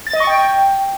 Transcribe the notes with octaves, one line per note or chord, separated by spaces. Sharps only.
A6
D#5
C#6
G5